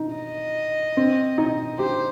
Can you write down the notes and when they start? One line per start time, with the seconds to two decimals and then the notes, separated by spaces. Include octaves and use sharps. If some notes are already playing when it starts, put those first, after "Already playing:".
Already playing: D#4
0.15 D#5
0.97 C4
1.38 D#4
1.78 G4 C5